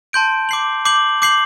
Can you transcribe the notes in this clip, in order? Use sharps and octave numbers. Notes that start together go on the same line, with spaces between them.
A5 C6 G6 D7
D6 G6 C7 F#7
D6 G6 C7 F#7
D6 G6 C7 F#7